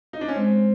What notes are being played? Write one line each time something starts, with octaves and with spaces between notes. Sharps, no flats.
D#4
D4
C#4
G#3 C4